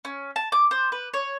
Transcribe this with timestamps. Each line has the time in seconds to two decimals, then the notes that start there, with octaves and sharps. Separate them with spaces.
0.05 C#4
0.36 A5
0.52 D6
0.71 C5
0.92 B4
1.14 C#5